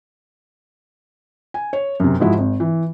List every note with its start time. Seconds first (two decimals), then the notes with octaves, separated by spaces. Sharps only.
1.54 G#5
1.73 C#5
2.00 F#2 C3
2.20 G#2 F3 G#3 E4 F#4
2.38 G#1
2.60 E3